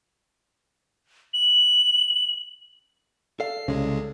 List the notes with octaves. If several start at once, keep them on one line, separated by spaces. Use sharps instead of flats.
F#7
A4 D5 F5 C7
C2 C#3 G#3